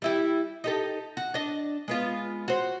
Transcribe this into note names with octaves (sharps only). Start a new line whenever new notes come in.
G3 E4 G4
D#4 G4 A4
F#4
D4 D#5
G#3 B3 F4
F#4 C5